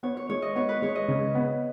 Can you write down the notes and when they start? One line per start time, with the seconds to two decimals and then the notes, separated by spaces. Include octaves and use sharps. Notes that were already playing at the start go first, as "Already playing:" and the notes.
0.03 B3 C#5
0.17 C#5
0.29 G#3 C#5
0.42 D#5
0.55 B3 C#5
0.69 B4
0.82 G#3 C#5
0.95 D#5
1.08 C#3
1.35 B3